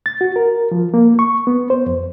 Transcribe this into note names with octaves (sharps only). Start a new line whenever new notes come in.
A6
F#4
A#4
F3
A#3
C#6
B3
C5
F2